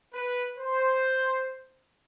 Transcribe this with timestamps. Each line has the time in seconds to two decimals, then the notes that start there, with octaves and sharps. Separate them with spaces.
0.14 B4
0.57 C5